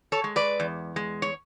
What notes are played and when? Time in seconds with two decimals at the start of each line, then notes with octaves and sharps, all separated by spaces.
0.12 A4 C#5
0.24 G#3
0.36 B4 D5
0.60 E2
0.96 G#3
1.22 C#5